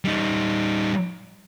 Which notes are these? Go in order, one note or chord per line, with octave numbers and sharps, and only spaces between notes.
G3 D#4